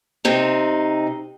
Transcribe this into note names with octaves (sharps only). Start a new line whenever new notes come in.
C3 C4 D#4